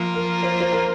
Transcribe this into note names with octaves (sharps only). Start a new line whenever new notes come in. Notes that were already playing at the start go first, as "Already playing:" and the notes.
Already playing: F3 A#3 F4
A#4
C5
C5
A#4